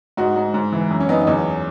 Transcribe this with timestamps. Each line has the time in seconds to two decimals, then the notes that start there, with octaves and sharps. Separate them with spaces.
0.17 G#2 D#4 F#4
0.36 G#2
0.54 G#2
0.72 E3
0.91 F#2
1.00 C#4
1.09 F#2 B3 D#4
1.21 D#4
1.27 E2 C#4